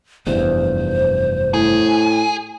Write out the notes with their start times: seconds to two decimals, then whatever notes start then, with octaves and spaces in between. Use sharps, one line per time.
0.27 F1 E2 G2 C5
1.54 A2 G#4